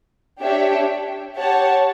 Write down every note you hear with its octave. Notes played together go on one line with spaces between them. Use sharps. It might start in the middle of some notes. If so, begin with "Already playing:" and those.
D4 G4 C#5 E5 G5
G4 C#5 F#5 A5